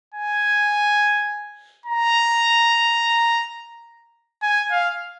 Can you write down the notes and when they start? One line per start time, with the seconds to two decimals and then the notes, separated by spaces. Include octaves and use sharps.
0.14 G#5
1.86 A#5
4.42 G#5
4.71 F5